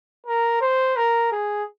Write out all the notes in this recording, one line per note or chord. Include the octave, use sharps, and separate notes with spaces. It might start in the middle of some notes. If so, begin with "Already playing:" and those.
A#4
C5
A#4
G#4